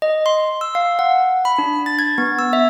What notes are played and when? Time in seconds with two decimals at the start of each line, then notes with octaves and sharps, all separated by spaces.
0.02 D#5
0.26 C6
0.61 E6
0.75 F5
0.99 F#5
1.45 B5
1.58 D4
1.86 A6
1.99 G#6
2.18 B3
2.39 E6
2.53 E5